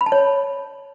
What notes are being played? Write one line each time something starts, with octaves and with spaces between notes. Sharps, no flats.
B5
A5
C#5